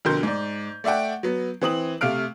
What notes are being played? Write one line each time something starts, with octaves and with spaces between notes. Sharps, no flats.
F2 B2 D3 A#4 C6 G6
G#2 D5
A3 D5 E5 F#5 G5
F#3 B3
E3 C4 D#6 F#7
C3 A3 F5 F6 D7